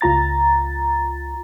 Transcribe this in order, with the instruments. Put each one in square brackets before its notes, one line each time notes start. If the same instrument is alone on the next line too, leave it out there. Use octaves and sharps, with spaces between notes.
[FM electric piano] C#2 F4 A#5 A6